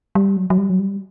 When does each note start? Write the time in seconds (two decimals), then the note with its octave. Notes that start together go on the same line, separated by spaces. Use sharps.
0.15 G3
0.37 F#3
0.50 F#3
0.58 G3
0.70 F#3
0.79 G3